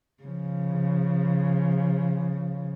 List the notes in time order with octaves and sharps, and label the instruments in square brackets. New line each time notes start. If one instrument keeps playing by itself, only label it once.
[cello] C#3 F3